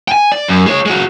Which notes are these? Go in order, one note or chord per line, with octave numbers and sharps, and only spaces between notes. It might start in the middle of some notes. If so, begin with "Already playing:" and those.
G5 G#5
D5
F#2
G#3 C#5
G#3 F#4